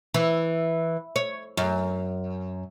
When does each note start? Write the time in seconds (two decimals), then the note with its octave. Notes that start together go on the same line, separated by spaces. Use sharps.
0.14 E3
1.16 C#5
1.57 F#2